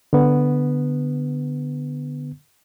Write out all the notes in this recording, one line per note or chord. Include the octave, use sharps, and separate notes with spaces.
D3 B3